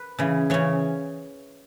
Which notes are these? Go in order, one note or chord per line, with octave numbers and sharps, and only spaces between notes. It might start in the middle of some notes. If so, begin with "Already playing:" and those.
Already playing: B4
C#3 E3
C#3 E3 C#5